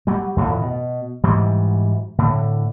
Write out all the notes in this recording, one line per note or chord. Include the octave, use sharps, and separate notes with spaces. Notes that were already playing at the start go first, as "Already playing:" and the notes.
F#3 G3
F2 A2 D#3 E3
B2
G#2 E3 F#3 G3
A2 D3